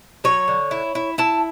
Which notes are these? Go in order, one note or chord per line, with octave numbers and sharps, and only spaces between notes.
F#3 C#5
D3
E4
E4
E4 A5